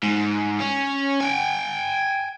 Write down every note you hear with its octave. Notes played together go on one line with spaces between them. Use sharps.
G#2
C#4
G5 G#5